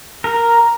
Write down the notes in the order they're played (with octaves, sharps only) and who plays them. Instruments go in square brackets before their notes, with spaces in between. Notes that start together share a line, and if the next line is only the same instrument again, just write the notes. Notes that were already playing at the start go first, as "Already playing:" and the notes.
[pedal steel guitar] A#4